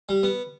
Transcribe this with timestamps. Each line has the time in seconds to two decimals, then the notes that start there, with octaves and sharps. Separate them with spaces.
0.09 G3
0.23 B3